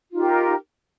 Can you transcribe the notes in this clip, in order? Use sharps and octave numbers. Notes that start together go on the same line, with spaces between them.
D#4 F4 G4 A#4